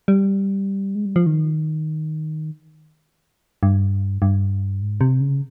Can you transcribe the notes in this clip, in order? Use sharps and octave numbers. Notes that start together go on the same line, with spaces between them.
G3
G#3
G3
F3
D#3
G2
G2
G#2
C3
C#3